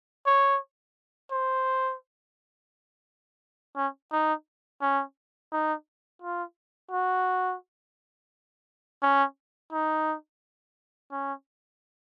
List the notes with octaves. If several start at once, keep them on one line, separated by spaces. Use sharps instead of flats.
C#5
C5
C#4
D#4
C#4
D#4
F4
F#4
C#4
D#4
C#4